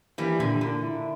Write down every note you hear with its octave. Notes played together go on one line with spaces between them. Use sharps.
E3 G3 A#3
A#2 D3
D3 A#3
E4